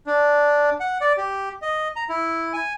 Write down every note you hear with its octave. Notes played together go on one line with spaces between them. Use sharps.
D4
F#5
D5
G4
D#5
A#5
E4
G#5